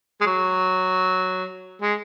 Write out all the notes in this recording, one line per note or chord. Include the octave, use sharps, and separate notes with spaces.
G#3
F#3
G#3